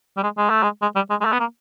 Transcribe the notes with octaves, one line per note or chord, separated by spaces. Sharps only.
G3
G#3
G#3
A3
G#3
G#3
G3
G#3
G#3
A3
B3
A#3